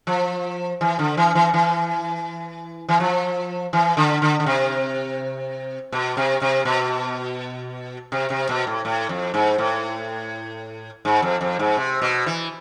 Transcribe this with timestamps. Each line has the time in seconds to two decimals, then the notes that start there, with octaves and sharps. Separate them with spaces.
0.07 F3
0.81 E3
0.99 D3
1.17 E3
1.35 E3
1.54 E3
2.89 E3
3.00 F3
3.73 E3
3.97 D3
4.22 D3
4.40 D3
4.46 C3
5.92 B2
6.17 C3
6.42 C3
6.65 B2
8.12 C3
8.30 C3
8.49 B2
8.67 A2
8.85 A2
9.09 F2
9.34 G#2
9.58 A2
11.05 G#2
11.22 F2
11.41 F2
11.59 G#2
11.77 C3
12.02 B2
12.26 E3